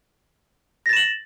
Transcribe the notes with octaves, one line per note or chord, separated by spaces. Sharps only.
A6 A#6 E7 F#7